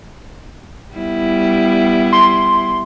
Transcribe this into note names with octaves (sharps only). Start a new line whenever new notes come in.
G3 B3 E4
C6